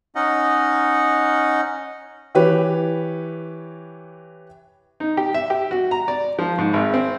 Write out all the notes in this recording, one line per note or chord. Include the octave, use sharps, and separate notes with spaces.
C#4 D#4 D#5 F#5
E3 G4 B4 C#5
D#4
G4
E5
G4
F#4
A#5
D5
F3
G#2
G#1
C4